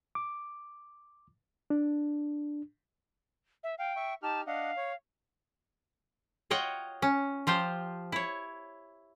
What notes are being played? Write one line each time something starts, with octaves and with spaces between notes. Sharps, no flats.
D6
D4
E5
F5 G5
E5 C#6
D#4 G4 A5 F6
D4 D#5 F5 F#5
C#5
F4 C#5 D#5 F#5 G5
C#4
F3 F4 G4 C5
E4 C#5